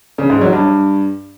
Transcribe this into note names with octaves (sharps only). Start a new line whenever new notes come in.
C#3
G#2
F#3
G2